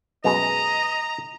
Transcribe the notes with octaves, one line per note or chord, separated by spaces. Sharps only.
F#2 B2 G#3 D#5 A#5